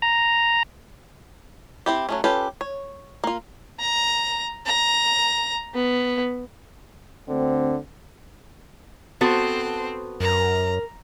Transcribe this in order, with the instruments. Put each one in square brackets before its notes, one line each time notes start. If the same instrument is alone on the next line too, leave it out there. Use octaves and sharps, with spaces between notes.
[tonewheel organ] A#5
[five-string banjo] C4 E4 G4
F#3 A3 C#4
C#4 F4 G4 A4 B4
C#5
A#3 F4
[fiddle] A#5
A#5
B3
[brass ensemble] D2 D3 C4
[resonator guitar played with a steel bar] B3 F#4 A4 [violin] C4 C5
[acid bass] F#2 [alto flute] A#4 [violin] A#5